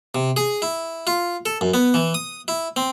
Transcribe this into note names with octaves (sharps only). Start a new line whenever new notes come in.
C3
G#4
E4
F4
A4
F#2
B3
E3
D#6
E4
C4